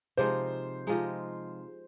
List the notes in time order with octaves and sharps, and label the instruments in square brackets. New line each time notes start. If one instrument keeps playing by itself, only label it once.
[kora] C3 F3 G#3 D#4 [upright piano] C5
[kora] C3 F3 G#3 D#4